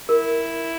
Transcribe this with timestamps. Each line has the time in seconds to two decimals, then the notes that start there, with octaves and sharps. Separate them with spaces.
0.09 E4 A#4